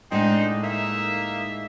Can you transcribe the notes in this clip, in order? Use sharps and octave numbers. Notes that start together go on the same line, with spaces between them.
A2 G#3 C4 D4 D#4 F#5
A#3 D#4 E5